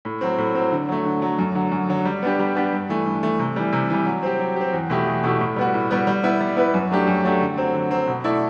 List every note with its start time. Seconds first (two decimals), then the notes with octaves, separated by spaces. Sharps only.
0.05 A2
0.21 F#3 C4
0.38 A2
0.55 F#3 C4
0.72 D3
0.89 F#3 A3
1.05 D3
1.22 F#3 A3
1.38 F#2
1.55 D3 F#3
1.72 F#2
1.89 D3 F#3
2.05 G3
2.22 B3 D4 G4
2.39 G3
2.55 B3 D4 G4
2.73 G2
2.89 E3 A3
3.05 G2
3.23 E3 A3
3.39 C3
3.56 E3 G3
3.73 C3
3.90 E3 G3
4.06 F#3
4.23 C4 G4
4.39 F#3
4.56 C4 G4
4.73 E2
4.90 B2 A3 E4 G4
5.06 E2
5.24 B2 A3 E4 G4
5.40 A2
5.56 G3 B3 F#4
5.74 A2
5.90 G3 B3 F#4
6.07 G3
6.23 B3 E4 B4
6.40 G3
6.56 B3 E4 B4
6.74 F#2
6.91 F#3 A3 D4 G4
7.07 F#2
7.24 F#3 A3 D4 G4
7.40 D3
7.57 F#3 C4
7.74 D3
7.90 F#3 C4
8.08 B2
8.24 A3 E4 A4 D5